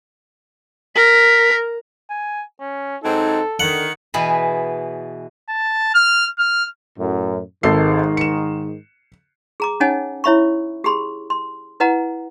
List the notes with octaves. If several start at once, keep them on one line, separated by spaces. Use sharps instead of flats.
A#4 B6
G#5
C#4
G#2 F#3 C4 D#4 A4
D3 D#3 F#5
B2 E3 G#4 B4 B5
A5
F6
F6
F#2 A2
G#1 G#2 D#3 A4 C7
C#7 E7
G#4 A#5 D6
C#4 D#4 C#5 D#5 F#5 G#5
E4 C#5 E5 B5 C#6
G4 G#4 B5 C6
C6
E4 B4 D#5 F#5 A#5